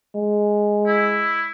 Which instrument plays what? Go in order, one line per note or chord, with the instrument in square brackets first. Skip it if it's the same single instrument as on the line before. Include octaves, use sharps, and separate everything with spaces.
[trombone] G#3
[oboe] E4